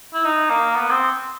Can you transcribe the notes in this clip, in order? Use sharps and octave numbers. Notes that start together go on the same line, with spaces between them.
E4
D#4
A#3
B3
C4